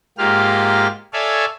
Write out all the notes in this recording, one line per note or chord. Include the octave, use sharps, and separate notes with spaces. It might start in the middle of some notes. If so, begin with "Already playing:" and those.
G#2 A#3 F4 G4 F6
A4 C#5 D5 E5 F5 G#5